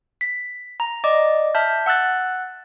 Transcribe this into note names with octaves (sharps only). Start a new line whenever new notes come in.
B6
A#5
D5 D#5 D6
E5 A5 F6 G6
F#5 E6 F#6 A6